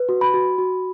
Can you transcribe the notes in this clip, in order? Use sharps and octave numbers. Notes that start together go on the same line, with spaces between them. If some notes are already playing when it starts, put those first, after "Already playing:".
Already playing: B4
F#4
B5
F#4
F#4